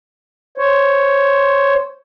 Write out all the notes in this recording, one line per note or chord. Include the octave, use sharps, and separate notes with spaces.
C5 C#5